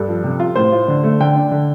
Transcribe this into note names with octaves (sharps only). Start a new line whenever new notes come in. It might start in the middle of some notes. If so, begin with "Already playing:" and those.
Already playing: G2 A4
F3
C3
F4
A2 C5
F4
D3
A3
D3 G5
D4
D3